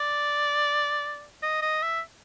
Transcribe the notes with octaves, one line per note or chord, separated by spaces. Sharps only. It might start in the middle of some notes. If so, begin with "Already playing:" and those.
Already playing: D5
D#5
D#5
E5